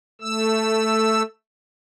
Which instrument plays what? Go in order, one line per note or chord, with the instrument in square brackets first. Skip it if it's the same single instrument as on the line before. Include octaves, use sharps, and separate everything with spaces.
[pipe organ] A3 E6